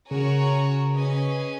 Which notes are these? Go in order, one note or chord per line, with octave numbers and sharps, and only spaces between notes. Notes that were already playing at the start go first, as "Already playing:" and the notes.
C#3 C#4 F#4 A#4 C#5 G#5
C#4 G#4 B4 D#5 G#5